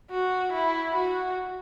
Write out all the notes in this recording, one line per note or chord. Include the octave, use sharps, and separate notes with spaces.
F#4
E4
F#4